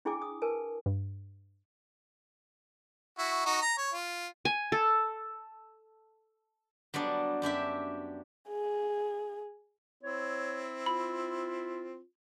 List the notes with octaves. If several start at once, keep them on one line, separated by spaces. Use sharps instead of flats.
D4 E4 G#4 G5 G#5 D6
D#6
A#4 B4 G#5 A5
G2
E4 F#4
D#4 F#4
A#5
C#5
F4
G#5
A4
F#3 G3 B3 D4
F#2 D4 G4 E5
G#4
C4 E4 C#5
F4 B5